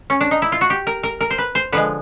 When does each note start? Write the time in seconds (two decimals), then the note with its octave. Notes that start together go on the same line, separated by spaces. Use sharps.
0.10 C#4
0.21 D4
0.31 D#4
0.42 E4
0.52 F4
0.61 F#4
0.70 G4
0.87 A#4
1.03 A#4
1.21 A#4
1.30 C5
1.38 B4
1.55 C5
1.72 D3 F3 G#3 B4